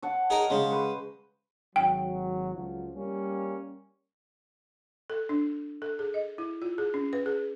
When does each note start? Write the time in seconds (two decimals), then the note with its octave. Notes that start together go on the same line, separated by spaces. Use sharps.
0.02 C#5 F#5 A5
0.30 D#4 G#4 A#4
0.50 C#3 G#3 C#4 C5
0.71 B4 C5
1.76 G#1 F#3 G5
2.54 C#2 F3 F#3
2.95 G3 A#3 C#4
5.10 A4
5.29 D4
5.82 A4
5.99 G#4
6.14 D#5
6.38 E4
6.62 F4
6.78 G#4
6.94 C#4
7.13 B4
7.26 G#4